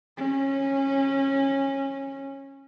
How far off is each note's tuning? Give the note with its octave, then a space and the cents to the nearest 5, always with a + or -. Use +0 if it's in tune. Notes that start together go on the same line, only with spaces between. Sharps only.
C#4 -20